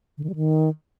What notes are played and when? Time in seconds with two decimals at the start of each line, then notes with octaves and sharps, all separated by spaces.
0.18 D3
0.24 D#3
0.29 G3
0.35 D#3